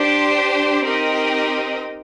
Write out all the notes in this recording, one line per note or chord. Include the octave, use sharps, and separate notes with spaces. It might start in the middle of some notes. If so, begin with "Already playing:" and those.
Already playing: D4 G4 C5
C4 D#4 G4 A#4 D#5